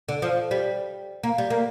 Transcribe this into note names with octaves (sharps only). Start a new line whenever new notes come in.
D3
F3
G3
A#3
G3
A#3